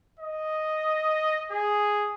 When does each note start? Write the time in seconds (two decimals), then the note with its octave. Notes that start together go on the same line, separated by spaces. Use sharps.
0.19 D#5
1.51 G#4